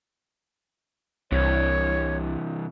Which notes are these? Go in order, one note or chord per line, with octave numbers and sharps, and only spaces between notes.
C2 C3 E3 C#5